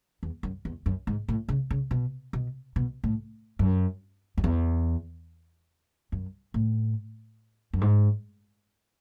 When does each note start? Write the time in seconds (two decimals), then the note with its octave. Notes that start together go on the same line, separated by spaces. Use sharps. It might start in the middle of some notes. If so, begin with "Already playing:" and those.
0.23 E2
0.43 F#2
0.65 E2
0.86 F#2
1.07 G#2
1.28 A2
1.48 C#3
1.71 C#3
1.91 B2
2.33 B2
2.76 B2
3.04 A2
3.59 F#2
4.38 F#2
4.44 E2
6.12 F#2
6.54 A2
7.73 F#2
7.81 G#2